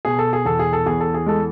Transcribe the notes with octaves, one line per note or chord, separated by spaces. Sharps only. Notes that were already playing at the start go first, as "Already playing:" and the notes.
B2 G#4
A4
G#4
E2 A4
G#4
A4
E2 G#4
A4
G#4
G#3 A4